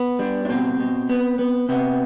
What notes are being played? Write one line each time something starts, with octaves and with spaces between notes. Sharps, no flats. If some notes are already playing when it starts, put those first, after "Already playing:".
Already playing: B3
G3 D4
D4
B2 C4
B2
B3
B3
C3 B3